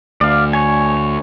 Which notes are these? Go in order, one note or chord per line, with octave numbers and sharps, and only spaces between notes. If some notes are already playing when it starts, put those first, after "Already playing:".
D2 D5 F5
C#5 G#5